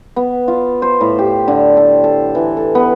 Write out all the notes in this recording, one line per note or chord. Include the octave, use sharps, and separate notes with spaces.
B3
F4
C5
A2
G4
D3
A4
A4
E3
A4
B3